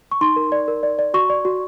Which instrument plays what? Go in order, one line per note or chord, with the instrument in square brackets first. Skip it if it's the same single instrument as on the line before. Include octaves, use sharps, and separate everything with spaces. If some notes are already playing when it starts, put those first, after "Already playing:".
[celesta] C#6
D#4 C6
A#4
D5
A#4
D5
D5
F#4 C#6
D5
F#4